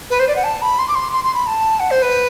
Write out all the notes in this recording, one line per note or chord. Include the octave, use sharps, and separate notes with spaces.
B4
C5
D5
F#5
A5
B5
C6
D6
C6
C6
C6
B5
A5
F#5
C5
B4